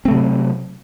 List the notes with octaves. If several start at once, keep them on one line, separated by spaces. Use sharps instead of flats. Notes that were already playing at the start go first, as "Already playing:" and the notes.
C3 F#3 A3 C4